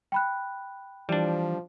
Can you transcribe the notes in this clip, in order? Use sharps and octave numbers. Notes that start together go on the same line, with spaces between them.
G5 B5 F#6
E3 F3 G3 D4